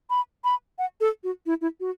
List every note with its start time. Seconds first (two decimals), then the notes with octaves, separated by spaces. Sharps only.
0.10 B5
0.44 B5
0.79 F#5
1.01 A4
1.24 F#4
1.46 E4
1.61 E4
1.80 F#4